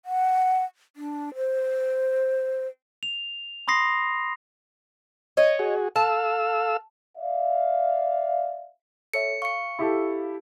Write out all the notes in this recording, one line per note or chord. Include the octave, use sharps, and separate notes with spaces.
F#5
D4
C5
F7
B5 C6 D#6 A#6 C7
C#5 D#5
F#4 G#4
A4 F5 A5 E6
D5 E5 F5
A4 C#5 E5 C#7
F5 C#6 C#7
E4 G4 A4